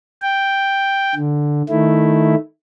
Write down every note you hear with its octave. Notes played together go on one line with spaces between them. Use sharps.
G5
D3
D#3 A3 E4